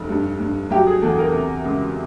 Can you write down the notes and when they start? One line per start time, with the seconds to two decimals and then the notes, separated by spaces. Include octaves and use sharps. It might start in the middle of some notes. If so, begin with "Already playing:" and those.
Already playing: F1
0.09 G2
0.40 G2
0.70 F#3 G4
0.87 G#4
1.02 E2 A4
1.18 A#4
1.33 C3
1.65 C#2